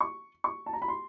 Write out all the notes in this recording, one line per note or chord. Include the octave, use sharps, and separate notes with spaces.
C#6
C#6
A5
A#5
B5
C6